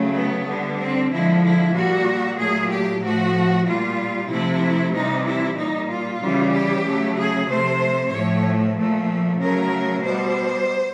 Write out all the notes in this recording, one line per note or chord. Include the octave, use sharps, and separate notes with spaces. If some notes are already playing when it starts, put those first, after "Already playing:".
Already playing: C#3 F#3 A3
B3
D3 G3
C4
D3 F3 G#3 E4
E4
A#2 G3 F#4
A#2 F#3 A3 G#4
G4
A2 F3 A3 F#4
A#2 G3 F4
C3 F3 A3 E4
C3 E3 G3 D#4
E4
A#2 G3 D#4
F4
C#3 E3 G3
G4
C#3 F#3 A3
G#4
C3 F3 A3 C5
A2 F3 A3 C#5
A#2 F3 A3
C#3 F#3 A3 A#4
B2 G3 C5